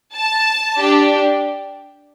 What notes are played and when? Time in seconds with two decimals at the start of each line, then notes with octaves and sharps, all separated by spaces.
0.15 A5
0.76 D4 G4